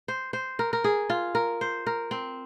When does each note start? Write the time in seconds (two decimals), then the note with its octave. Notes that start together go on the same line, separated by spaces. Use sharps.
0.08 C5
0.33 C5
0.59 A#4
0.73 A#4
0.84 G#4
1.10 F4
1.35 A#4
1.61 C5
1.87 A#4
2.11 C4